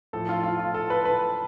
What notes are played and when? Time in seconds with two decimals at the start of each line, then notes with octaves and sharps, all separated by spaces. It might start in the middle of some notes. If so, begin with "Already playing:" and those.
0.13 A2 F3 A4
0.29 F4
0.43 F4
0.59 F4
0.74 A4
0.90 B4
1.05 B4